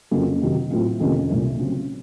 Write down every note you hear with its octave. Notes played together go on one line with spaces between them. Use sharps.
F2 C#3 F#3 A#3
C3 D#3 F#3
A2 F#3 C4 F4
F2 C3 D#3 A#3 C#4
C2 A#2 F3 A3
C#3 F#3 C4